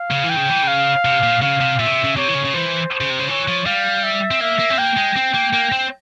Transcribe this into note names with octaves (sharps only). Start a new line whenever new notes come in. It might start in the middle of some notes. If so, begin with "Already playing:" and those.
Already playing: F5
C#3
E3
G5
C#3
E3
C#3 F5
C3
A#2
C#3 F5
C3
A#2 E5
C#3
C3
C#3
C3 C#5
E3
C#3
C#3
E3 C5
C5
C#3
C3
C#3
E3 C#5
F3
G3 F5
E5
C4
A#3 E5
A#3
C4
A#3 G5
G#3
C4
A#3
A#3
C4